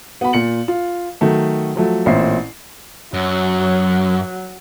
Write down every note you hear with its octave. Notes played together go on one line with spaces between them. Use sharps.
B3 F#4 B5
A#2 C#7 F#7
F4
D#3 F#3 A3
F3 F#3 A3
A1 A#2 C4 E5 C7
F#2 F#3